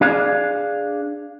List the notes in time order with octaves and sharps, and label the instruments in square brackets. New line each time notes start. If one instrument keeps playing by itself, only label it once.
[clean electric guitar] D4 G#4 F5